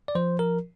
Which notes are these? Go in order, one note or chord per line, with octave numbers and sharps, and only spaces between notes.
D5
F3 C5
A#4